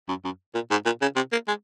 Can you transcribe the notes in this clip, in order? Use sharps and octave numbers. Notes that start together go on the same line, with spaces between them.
F#2
F#2
A#2
G#2
A#2
C#3
C3
A#3
G#3